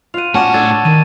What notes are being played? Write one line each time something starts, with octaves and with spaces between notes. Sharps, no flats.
F4 F#5 D#7 F7
A2 C#4 F#4 D5 F#5 A5 C#6 E7
D4 A4 G#6 A6
A5
D#3 D#7